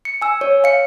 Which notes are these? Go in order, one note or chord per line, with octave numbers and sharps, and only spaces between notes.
C#7
G#5 E6
C#5
F5 C#7